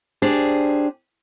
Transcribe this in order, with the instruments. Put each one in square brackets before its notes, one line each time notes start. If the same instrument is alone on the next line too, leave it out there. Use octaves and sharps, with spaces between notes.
[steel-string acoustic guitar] D4 G4 G#4 C5